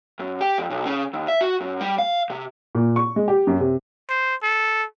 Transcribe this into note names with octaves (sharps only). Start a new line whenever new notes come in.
F#2
G4
F2
B1
C#3
D#2
E5
F#4
F#2
G3
F5
C3
A#2
C#6
G#3
G4
F#2
C3
C5
A4